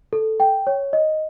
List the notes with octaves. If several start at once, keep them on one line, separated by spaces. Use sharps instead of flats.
A4
G5
C#5
D#5